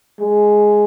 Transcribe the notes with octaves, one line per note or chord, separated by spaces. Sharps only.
G#3